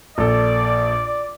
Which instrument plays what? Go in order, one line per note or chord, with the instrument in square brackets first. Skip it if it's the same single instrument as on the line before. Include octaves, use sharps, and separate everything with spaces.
[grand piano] A#1 A4 [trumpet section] D5